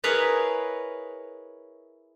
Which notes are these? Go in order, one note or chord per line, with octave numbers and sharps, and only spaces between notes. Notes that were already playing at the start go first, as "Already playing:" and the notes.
E4 G#4 A#4 B4 C#5 D#5